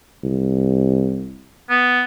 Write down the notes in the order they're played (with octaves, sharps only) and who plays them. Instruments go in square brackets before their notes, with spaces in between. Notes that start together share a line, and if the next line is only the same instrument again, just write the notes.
[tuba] C2
[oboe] B3